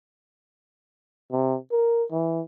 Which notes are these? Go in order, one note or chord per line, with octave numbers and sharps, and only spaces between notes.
C3
A#4
E3